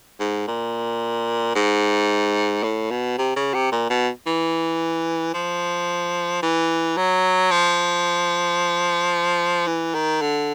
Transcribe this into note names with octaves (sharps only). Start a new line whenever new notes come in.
G#2
A#2
G#2
A2
B2
C3
C#3
C3
A#2
B2
E3
F3
E3
F#3
F3
E3
D#3
D3